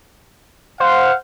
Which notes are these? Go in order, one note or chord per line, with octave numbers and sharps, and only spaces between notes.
C5 F5 F#5